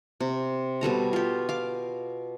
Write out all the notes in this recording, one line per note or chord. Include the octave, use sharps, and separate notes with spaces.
C3
B2 G3 A4 A#5
F4 G4
F5 D6